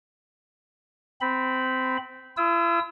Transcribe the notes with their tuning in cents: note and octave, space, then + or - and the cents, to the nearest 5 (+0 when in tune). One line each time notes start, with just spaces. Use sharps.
C4 -15 B5 +0
E4 +45 E6 -30